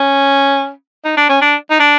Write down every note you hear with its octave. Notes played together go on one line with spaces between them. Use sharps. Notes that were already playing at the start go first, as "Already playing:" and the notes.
Already playing: C#4
D#4
D4
C#4
D4
D#4
D4